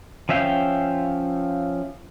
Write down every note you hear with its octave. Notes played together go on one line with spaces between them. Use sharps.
F3 C#4 E5 F5 G5